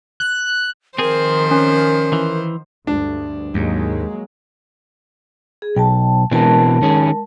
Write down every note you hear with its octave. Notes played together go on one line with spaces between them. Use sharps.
F#6
D#3 F3 C4 G#4 A#4 C5
C#4
E3
D2 G2 D4
D#2 G#2 F#3 G#3 A#3
G#4
B1 G5 A5
B2 E3 G#3 C4 A#4 A5
D#3 C#4 G#4